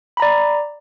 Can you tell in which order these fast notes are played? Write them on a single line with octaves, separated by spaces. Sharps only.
B5 A#5 D5